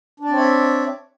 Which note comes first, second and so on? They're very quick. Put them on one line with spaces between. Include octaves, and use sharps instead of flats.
D4 D5 C4 C#5 E5